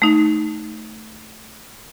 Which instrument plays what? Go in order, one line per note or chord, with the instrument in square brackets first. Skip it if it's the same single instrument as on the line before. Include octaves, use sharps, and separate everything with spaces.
[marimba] A3 D#4